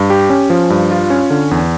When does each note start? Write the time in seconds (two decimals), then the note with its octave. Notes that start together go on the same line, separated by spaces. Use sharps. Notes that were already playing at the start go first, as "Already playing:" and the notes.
Already playing: G2
0.10 G4
0.30 C#4
0.50 F3
0.70 G2
0.91 F4
1.10 C#4
1.30 D3
1.51 E2